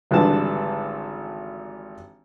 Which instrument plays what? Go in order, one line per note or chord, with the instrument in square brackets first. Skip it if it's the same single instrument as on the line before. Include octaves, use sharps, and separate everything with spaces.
[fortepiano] G#1 D3 E3 G3 A5